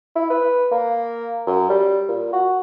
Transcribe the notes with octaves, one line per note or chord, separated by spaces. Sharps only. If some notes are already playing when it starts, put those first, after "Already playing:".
E4
B4
A#3
F#2
G3
A#2
F#4